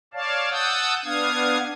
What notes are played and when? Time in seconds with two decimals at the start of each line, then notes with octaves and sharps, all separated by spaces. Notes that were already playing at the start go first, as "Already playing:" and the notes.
0.14 C#5 D5 F5 A5
0.51 F#5 A5 D#6 E6 G6
1.05 B3 D4 F5 D#6 G#6